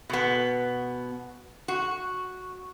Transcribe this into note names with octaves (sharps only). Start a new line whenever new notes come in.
B2 B3
F#4